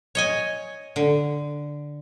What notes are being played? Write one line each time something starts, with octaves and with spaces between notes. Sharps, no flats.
C#5 D#5 G#5
D3